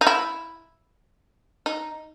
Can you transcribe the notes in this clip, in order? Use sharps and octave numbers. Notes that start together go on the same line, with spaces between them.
D#4
E4
D#4